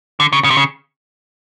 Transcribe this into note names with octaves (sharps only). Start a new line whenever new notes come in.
D3
C#3
C#3
C3
C#3